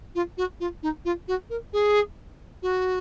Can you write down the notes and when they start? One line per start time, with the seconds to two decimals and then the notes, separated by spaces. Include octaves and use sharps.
0.15 F4
0.37 F#4
0.60 F4
0.82 D#4
1.05 F4
1.28 F#4
1.49 A#4
1.73 G#4
2.62 F#4